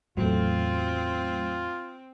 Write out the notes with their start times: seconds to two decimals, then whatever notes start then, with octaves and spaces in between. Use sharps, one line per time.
0.17 E2 A2 F#3 A3 C4 F4